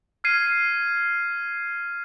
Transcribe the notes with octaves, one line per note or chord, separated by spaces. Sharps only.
F6 G#6 C7 D#7